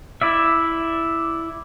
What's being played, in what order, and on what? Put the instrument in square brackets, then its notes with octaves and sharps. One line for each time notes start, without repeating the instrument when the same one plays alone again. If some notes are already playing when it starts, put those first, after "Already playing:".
[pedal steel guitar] E4 D5 E5